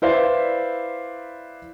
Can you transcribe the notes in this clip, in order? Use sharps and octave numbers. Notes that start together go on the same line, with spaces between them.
E4 B4 C5 D5 E5 F5